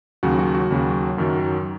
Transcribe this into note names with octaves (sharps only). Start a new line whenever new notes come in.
D#2 C#3 F#3 F#4
F#4
F#4
D#2 C#3 F#3
F#2 D#3 F#3